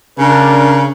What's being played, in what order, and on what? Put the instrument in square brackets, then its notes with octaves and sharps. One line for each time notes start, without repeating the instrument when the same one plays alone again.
[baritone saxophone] C#3 [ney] D4 [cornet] A#4